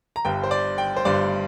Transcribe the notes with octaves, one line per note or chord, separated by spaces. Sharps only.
A#5
G1 G2 G3 G5
C5
D5
G5
C5
G1 G2 G3 D5